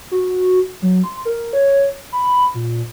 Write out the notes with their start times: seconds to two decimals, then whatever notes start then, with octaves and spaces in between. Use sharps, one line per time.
0.11 F#4
0.82 F#3
1.04 C6
1.25 A#4
1.53 C#5
2.12 B5
2.54 A#2